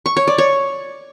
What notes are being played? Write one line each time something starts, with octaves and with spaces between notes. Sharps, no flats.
C#6
C#5
D5
C#5